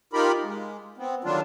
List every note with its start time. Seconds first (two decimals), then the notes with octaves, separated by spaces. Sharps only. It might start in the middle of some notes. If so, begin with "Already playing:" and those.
0.13 D#4 F4 G4 A#4 B5
0.43 G#3
0.98 B3 C4
1.24 D3 D#3 F#3 G3 D4 F4